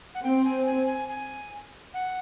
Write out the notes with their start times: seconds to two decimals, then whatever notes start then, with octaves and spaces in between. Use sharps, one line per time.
0.15 F#5
0.23 C4 G5
0.45 G#5
0.66 G#5
0.87 G#5
1.09 G#5
1.94 F#5